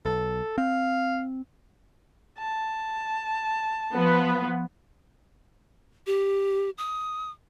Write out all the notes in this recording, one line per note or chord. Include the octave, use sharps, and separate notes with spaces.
B1 A4
C4 F5
A5
F3 B3
G4
D#6